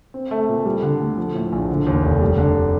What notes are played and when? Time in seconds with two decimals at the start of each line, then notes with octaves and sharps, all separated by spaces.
0.14 C4
0.31 A3
0.48 A#2
0.65 G3
0.82 D3
1.00 D2
1.17 F3
1.34 A2
1.52 A#1
1.69 D3
1.87 D#2
2.04 F1
2.21 G3
2.38 D3